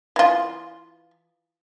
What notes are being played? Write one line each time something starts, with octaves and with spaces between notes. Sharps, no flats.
E3 F4